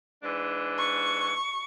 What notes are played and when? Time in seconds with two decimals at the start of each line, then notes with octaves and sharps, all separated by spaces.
0.22 G#2 E3 D4
0.79 C#6